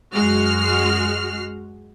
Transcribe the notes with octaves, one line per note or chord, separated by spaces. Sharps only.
F#2 G#3 F#4 F6 C7